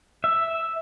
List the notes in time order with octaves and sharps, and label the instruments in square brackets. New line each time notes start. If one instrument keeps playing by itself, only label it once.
[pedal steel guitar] E5